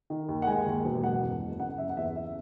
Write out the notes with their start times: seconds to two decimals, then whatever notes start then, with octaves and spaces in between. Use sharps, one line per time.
0.10 D#3
0.28 D#2
0.42 F#5
0.47 G#3 G#5
0.66 D#2
0.85 E1
1.03 F#1 F#5
1.22 E2
1.41 F#1
1.60 C#3 F#5
1.78 F#1 E5
1.89 F#5
1.97 E2 E5
2.16 C#3 E5